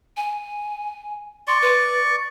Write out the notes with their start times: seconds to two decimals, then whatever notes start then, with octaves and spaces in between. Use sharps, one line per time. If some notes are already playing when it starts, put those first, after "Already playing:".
0.17 G#5
1.48 D5 C6 C#6
1.62 B4